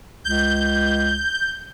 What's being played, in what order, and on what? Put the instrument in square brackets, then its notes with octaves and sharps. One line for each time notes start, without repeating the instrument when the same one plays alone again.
[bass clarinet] C#2 [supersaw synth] G6